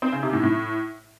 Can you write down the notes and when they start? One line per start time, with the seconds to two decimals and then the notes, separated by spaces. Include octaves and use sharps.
0.02 C4
0.12 C#3
0.23 C3
0.33 A2
0.43 A2